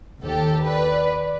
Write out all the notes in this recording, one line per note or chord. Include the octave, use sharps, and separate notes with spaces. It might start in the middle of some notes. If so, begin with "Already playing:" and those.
D#2 G4 A4
B4 D5